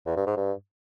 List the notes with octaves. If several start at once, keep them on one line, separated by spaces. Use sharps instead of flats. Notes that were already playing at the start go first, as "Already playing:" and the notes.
E2
G2
G#2
G2